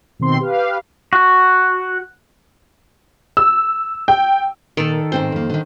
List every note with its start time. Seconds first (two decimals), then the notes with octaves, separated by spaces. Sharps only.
0.19 B2 D#3 C4 C6
0.40 G4 B4 F5
1.13 F#4
3.37 E6
4.08 G5
4.77 A#2 D#3 A4
5.12 G#2 C4 C5 G5
5.32 F2 A#3
5.50 D3 D#3